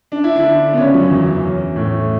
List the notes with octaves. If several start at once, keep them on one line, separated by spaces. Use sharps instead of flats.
D4
E4
D3 D4
B3
C#3 C#4
F#2 F#3
E2 E3
A2